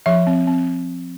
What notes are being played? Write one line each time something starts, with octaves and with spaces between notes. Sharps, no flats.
F3 E5
C4
C4